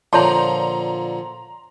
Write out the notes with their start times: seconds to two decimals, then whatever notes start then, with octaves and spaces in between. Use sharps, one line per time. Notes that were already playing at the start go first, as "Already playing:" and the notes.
0.13 A#2 D3 F3 C#5 A5 A#5 C6